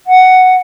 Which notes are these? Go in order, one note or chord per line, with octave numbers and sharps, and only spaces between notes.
F#5